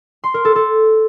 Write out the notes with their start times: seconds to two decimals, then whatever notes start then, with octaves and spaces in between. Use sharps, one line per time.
0.24 C6
0.34 A#4
0.45 A4
0.56 A4